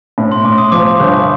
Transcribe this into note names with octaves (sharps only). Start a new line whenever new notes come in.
A2
C6
A2 D6
D#6
F3 D6
G1